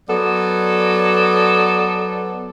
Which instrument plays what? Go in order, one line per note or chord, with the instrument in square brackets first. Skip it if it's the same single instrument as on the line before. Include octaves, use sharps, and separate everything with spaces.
[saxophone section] F#3 B3 A4 D5